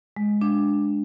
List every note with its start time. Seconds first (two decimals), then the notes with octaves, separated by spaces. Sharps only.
0.17 G#3
0.41 D4